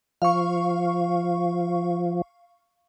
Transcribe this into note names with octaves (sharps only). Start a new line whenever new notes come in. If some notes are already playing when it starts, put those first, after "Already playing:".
F3 F5 C#6